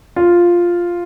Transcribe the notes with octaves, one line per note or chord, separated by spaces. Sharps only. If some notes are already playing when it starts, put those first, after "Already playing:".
F4